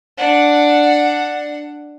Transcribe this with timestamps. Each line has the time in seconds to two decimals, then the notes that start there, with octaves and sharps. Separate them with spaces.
0.18 D4 F#5